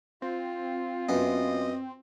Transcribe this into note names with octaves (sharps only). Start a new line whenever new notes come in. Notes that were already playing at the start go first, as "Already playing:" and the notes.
C4 F4
F#2 B3 D#5